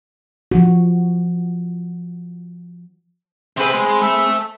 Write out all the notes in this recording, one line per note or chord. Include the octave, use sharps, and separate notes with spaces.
F3 F#4
C3 C4 G4 G#4 B4
G#3
A4 E5